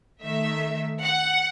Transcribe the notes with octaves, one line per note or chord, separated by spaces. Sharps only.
D#3 A3 E5
F#5